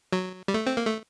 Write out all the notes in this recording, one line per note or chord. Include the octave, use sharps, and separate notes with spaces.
F#3
G3
A3
C4
A#3
A3